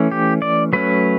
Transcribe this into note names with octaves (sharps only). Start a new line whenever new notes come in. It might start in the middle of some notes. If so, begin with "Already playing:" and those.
Already playing: E3 A3 C#4
G4
D5
F#3 A3 C#4 B4